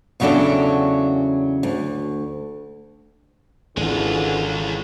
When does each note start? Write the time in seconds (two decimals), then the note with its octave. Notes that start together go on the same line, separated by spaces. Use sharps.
0.20 E2 C#3 F#3 C#4 D4 A4
1.63 D2
3.77 G#1 F#2 D3 E3 G#3 F4 G#4